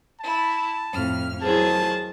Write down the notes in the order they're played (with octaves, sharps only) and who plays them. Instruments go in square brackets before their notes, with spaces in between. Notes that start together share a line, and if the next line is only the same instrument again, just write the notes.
[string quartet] E4 [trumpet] A5
[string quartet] F2 A2 F6
[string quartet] D#3 E3 F#3 [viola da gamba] G#4 C5 [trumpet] A5